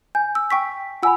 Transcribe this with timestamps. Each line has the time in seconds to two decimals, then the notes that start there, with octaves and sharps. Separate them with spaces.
0.15 G#5 G6
0.35 E6
0.50 G5 C#6 B6
1.03 F4 F#5 G#5 B5 E6